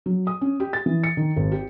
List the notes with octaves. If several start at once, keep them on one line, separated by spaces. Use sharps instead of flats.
F#3
D#6
C#4
G4
A6
E3
C#7
D#3
G#1
G4